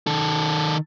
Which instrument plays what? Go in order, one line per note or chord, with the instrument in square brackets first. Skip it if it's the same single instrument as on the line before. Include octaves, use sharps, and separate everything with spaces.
[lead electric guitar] D#3 A4